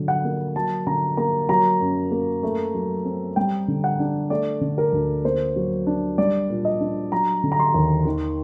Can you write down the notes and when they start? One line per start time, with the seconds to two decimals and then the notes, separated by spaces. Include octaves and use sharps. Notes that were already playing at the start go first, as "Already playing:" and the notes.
Already playing: D3 F#3
0.08 F#5
0.25 A#3
0.56 F#3 A5
0.87 D3 A#5
1.17 A#3 A#5
1.49 F#3 A#5
1.81 F#2
2.11 A#3
2.43 A3
2.75 F#3
3.05 C4
3.36 G3 G5
3.68 D3
3.84 F#5
3.99 D4
4.30 A3 D5
4.61 D3
4.78 A#4
4.93 D2
5.25 A#3 C5
5.56 F#3
5.87 D4
6.18 G3 D5
6.50 A#2
6.65 D#5
6.80 D4
7.12 F#3 A#5
7.44 D3
7.52 A#5
7.60 C6
7.74 D#2
8.05 D#3